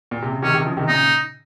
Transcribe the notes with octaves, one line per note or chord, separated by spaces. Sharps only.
A#2
C3
C#3
C3 D#3 C#4
C3 D#3
C#3 F3
C3 D#3
A#2 C#3 D#4